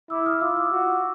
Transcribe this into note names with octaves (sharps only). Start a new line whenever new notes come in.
E4 D6 E6
D#6 F6
F4 D6 E6
D6 E6
F#4